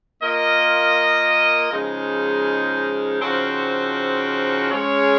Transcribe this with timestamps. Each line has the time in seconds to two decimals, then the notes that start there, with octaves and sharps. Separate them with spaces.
0.21 A#3 F4 A#4 D#5
1.71 C#3 F3 G#3 D#4
3.21 C#3 F3 C4 D#4 F#4
4.71 G#3 C#4 G#4 C#5